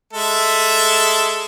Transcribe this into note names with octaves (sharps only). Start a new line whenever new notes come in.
G#3 A4 E5